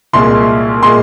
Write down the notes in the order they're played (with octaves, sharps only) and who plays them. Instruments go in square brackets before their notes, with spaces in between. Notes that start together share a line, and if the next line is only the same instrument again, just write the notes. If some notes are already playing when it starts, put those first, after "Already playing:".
[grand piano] C2 A#2 G#3 C6
A#2 G#3 C6